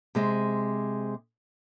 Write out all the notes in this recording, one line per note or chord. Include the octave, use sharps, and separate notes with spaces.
C3 G#3 C4